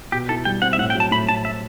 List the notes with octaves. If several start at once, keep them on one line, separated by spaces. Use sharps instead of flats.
B2 G4
E4 A4
G3 G5
C4 F#5
E5
A2 F#5
G5
F#3
A5
A2 B5
A2 A5
E5